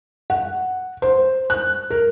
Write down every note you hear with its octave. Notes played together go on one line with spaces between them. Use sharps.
F#5
C5
F#6
A#4